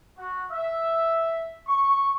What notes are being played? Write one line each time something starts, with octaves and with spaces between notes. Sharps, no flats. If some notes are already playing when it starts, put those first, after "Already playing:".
F#4
E5
C#6